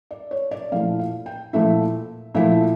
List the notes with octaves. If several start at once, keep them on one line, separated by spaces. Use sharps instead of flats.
D5
C#5
D5
A#2 F3 A3 E4 F5
F5
G5
A#2 F3 A3 E4 E5
A#2 F3 A3 E4 E5